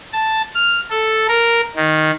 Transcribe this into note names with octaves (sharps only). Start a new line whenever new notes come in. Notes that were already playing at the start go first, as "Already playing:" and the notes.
A5
F6
A4
A#4
D#3